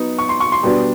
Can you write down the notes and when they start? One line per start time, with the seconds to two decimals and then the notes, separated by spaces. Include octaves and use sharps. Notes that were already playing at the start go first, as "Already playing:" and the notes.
Already playing: F#3 B3 D#4
0.18 C#6
0.29 C6
0.40 C#6
0.52 C6
0.63 B2 G3 B3 D4